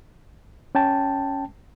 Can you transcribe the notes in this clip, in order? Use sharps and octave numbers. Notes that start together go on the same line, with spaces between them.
C#4 G5 A5